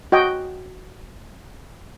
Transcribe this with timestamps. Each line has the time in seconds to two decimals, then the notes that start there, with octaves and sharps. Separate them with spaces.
0.12 F#4 D#5 G5